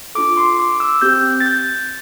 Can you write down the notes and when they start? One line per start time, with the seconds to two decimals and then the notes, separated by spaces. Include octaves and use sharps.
0.15 D4 F4 A4 D6
0.37 C6
0.59 D6
0.80 E6
1.02 C4 G4 G6
1.40 A6
1.46 G6